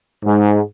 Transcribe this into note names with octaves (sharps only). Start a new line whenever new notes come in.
G#2